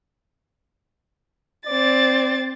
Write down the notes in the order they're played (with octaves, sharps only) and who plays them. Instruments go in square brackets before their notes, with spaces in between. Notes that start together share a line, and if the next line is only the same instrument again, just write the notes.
[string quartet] C4 A6 [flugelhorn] D5